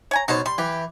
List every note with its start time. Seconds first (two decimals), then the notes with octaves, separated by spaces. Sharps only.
0.11 C#5 G#5 A#5
0.28 B2 C#4 D#4 C5 A5
0.46 G3 C6
0.58 E3 G4